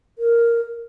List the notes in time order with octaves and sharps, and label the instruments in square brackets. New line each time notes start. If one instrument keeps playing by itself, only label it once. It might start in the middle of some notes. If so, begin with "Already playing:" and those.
[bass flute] A#4